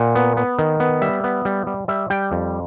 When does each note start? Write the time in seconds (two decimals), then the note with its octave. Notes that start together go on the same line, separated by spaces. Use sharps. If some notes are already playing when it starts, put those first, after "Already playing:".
Already playing: A#2 F#5
0.15 B3
0.37 B3
0.59 D#3
0.80 B3
1.01 G3 E5
1.24 B3
1.45 G3
1.67 G3
1.88 G3 E5
2.10 G3 G5
2.32 F2